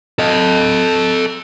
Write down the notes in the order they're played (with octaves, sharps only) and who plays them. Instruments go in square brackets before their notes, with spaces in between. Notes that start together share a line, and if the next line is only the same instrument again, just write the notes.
[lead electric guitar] A4 D#5